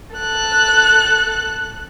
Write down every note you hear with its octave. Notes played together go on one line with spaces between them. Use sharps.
A4 F#6